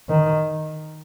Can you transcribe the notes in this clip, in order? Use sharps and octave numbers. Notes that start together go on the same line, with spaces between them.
D#3